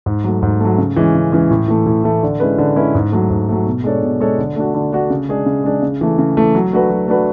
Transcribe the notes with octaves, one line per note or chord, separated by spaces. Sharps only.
G#2
F#3 A3
G#2
F#3 A3
C#3
E3 G#3 C#4
C#3
E3 G#3 C#4
A2
E3 A3
A2
E3 A3
D3
G#3 C#4 E4 B4
D3
G#3 C#4 E4 B4
G#2
F#3 A3
G#2
F#3 A3
B2
G#3 D4 A4 C#5
B2
G#3 D4 A4 C#5
D3
A3 D4 F#4
D3
A3 D4 F#4
C#3
G#3 D4 G#4
C#3
G#3 D4 G#4
C#3
E3 A3
C#3
E3 A3
F#3
A3 D4 F#4 B4
F#3
A3 D4 F#4 B4